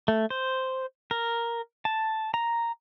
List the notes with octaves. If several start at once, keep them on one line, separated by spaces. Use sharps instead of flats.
A3
C5
A#4
A5
A#5